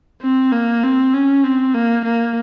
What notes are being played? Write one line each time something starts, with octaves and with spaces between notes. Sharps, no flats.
C4
A#3
C4
C#4
C4
A#3
A#3